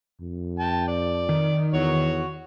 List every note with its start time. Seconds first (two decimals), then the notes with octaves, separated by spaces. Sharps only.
0.21 F2
0.59 G5 A5
0.88 D5
1.29 D#3
1.74 E2 F#4 C#5